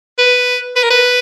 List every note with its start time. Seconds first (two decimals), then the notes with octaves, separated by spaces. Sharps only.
0.18 B4
0.76 B4
0.83 A#4
0.91 B4